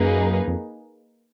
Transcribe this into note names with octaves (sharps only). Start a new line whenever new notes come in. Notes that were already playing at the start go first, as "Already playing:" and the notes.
Already playing: F#2 A#3 D#4 G#4 B4
F2